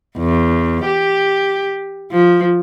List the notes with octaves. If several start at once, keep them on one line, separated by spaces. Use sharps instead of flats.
E2
G4
F3